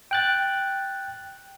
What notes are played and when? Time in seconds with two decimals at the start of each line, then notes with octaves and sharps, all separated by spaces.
0.11 G5 F#6 A6